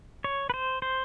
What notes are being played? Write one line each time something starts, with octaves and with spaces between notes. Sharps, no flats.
C#5
B4
C5
C5